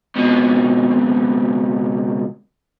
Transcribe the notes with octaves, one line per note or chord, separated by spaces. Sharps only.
C#2 B2